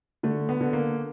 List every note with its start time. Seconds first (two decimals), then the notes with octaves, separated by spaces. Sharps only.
0.23 D3 A3
0.49 B3
0.61 D3
0.73 A#3